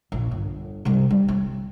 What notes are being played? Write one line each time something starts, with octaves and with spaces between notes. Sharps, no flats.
A#1
G1
C3 G3
G3
C4